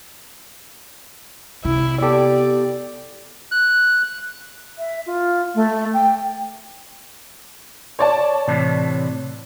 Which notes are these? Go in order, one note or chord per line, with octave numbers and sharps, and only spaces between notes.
C3 E4
B3 G4 A4 D5
F#6
E5
F4
A3
G5
C#5 D5 A5
A2 C3 E3